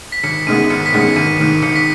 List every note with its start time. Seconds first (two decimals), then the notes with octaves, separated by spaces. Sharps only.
0.12 B6
0.23 G#1 C#7
0.47 F#2 D#3 G#3 B3 D#7
0.70 G#1 C#7
0.86 B6
0.93 F#2 D#3 G#3 B3
1.01 C#7
1.16 G#1 D#7
1.27 C#7
1.38 G#2 D#3 D#7
1.62 G#1 C#7
1.76 B6